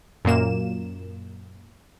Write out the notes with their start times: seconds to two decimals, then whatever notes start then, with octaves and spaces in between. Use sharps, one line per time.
0.25 F#2 A#2 A#3 E7